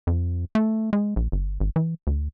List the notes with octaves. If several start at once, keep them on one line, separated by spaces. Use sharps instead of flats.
F2
A3
G#3
A#1
G1
G#1
E3
D2